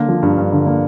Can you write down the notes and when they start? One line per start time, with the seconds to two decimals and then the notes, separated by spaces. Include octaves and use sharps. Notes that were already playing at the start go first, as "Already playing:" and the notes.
Already playing: D3 A#3
0.09 F3
0.23 G2
0.38 G2
0.52 D3
0.66 A#3